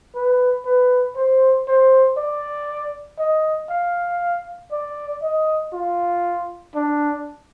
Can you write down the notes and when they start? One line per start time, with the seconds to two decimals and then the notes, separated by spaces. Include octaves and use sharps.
0.15 B4
0.65 B4
1.16 C5
1.67 C5
2.17 D5
3.19 D#5
3.70 F5
4.71 D5
5.22 D#5
5.73 F4
6.75 D4